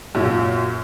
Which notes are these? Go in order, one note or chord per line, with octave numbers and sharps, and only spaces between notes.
F#2 A#2